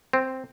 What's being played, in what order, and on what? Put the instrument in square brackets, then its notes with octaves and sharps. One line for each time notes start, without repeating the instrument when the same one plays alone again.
[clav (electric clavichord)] C4